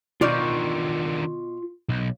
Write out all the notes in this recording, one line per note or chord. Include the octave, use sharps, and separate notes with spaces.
B2 D3 D#3 F4 D5 F5 C#6 G6
B1